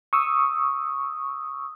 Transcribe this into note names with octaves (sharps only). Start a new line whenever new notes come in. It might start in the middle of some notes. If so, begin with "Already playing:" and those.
C#6 D#6 E6